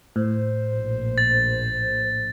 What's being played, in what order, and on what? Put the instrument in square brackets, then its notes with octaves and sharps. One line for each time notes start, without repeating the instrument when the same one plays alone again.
[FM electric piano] A2 [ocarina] C5
[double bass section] A#1
[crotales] A6